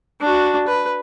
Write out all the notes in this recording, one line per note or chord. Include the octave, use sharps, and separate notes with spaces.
D4 F#4
B4